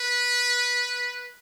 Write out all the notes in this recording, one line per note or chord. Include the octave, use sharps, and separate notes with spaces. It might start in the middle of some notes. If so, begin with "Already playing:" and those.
Already playing: B4